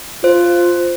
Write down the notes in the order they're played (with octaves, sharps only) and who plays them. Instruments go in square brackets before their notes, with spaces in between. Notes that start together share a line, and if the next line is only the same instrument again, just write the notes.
[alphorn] F4 [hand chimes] C5